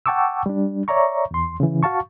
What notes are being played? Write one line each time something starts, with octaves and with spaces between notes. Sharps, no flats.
F#5 G5 A5 C#6 D6 E6
G3 D4
C#5 D5 E5 A#5 C#6
E2 C6
C#3 E3
F#4 F5 A5 C#6